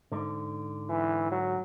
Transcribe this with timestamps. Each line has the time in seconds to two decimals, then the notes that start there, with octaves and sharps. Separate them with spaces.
0.12 G#2 D3
0.89 E3
1.31 F#3